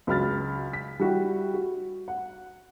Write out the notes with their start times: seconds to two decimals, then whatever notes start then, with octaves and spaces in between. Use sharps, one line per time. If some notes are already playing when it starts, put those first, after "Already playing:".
0.07 C#2 F#3 B5 F6 A6
0.73 B6
1.00 G3 E4 F#4 G4
1.54 F#4
2.08 F#5